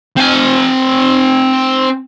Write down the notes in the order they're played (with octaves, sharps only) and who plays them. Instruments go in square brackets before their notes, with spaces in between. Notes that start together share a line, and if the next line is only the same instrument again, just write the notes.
[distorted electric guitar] C4 G#5